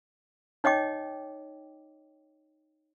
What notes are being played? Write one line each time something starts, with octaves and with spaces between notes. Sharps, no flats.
D#4 C#5 D#5 G5 D6